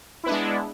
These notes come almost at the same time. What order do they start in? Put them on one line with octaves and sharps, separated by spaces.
E4 B3 D4 G#3